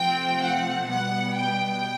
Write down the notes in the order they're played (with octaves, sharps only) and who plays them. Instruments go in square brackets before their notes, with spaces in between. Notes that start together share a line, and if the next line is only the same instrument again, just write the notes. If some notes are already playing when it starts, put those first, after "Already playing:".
Already playing: [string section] C3 F3 A3 C4 F4 G5
F#5
B2 G3 B3 F#5
G5